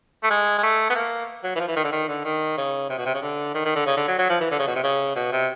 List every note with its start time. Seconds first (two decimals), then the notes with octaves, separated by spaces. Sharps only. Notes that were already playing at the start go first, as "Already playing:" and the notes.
0.23 A3
0.30 G#3
0.58 G#3
0.63 A3
0.90 B3
0.95 A#3
1.44 F#3
1.56 E3
1.60 F3
1.68 E3
1.76 D#3
1.84 D3
1.92 D#3
2.08 D3
2.25 D#3
2.58 C#3
2.90 C3
2.98 B2
3.06 C3
3.14 C#3
3.22 D3
3.54 D#3
3.65 D#3
3.76 D3
3.86 C#3
3.97 D3
4.08 F#3
4.19 F#3
4.30 F3
4.40 E3
4.51 D3
4.59 C#3
4.67 B2
4.76 C3
4.83 C#3
5.16 B2
5.32 C3